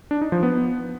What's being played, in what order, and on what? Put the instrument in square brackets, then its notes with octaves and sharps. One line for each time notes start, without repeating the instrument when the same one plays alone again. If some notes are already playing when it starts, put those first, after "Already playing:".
[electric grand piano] D4
D#4
F3
B3